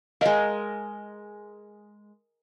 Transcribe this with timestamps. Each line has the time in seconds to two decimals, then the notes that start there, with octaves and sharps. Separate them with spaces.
0.21 G#3 A#4 D#5 F5